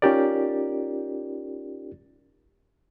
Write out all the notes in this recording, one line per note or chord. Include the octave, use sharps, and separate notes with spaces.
C#4 D#4 F4 G4 A#4 D5